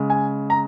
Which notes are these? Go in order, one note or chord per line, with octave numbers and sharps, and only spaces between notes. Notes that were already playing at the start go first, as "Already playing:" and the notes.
Already playing: C#3 G#3
G#5
A#5